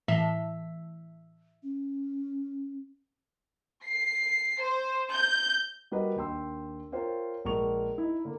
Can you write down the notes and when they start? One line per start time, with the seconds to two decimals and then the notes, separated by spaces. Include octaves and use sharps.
0.08 A2 E3 E5
1.63 C#4
3.86 C7
4.61 C5
5.13 G6
5.92 G3 F#4 A#4 B4 D#5
6.16 D#2 D4 G5 C6 E6
6.92 F4 A#4 C5 C#5 F5 G5
7.45 A#1 G#3 A#4 C#6 F7
7.98 D#4 E4
8.25 D3 A#3